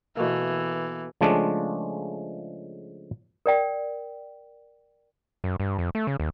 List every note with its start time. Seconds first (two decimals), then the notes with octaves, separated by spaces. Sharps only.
0.17 B2 E3 A3 A#3
1.21 C#3 F3 G#3 A3 D4
3.46 A#4 D5 G5
5.44 F#2
5.60 G2
5.79 F2
5.95 A3
6.07 C#3
6.20 D#2